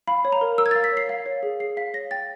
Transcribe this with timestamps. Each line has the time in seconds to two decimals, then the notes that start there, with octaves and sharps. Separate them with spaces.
0.08 F5 B5
0.25 C#5
0.32 A#5
0.41 A#4
0.58 A#4 E6
0.66 G#6
0.71 F5 A6
0.84 B6
0.92 C#5
0.97 C7
1.09 F5
1.26 C#5
1.43 G#4
1.60 G#4 C7
1.77 F5 B6
1.94 C#5 A#6
2.11 G5 A6